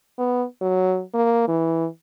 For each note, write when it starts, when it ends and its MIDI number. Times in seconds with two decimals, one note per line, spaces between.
0.18 0.44 59
0.61 1.01 54
1.14 1.43 58
1.48 1.86 52